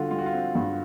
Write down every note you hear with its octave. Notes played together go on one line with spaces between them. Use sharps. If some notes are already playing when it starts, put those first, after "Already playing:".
Already playing: D3 G3 F4 F#4
G3 F4
F#4
F4
C4
G2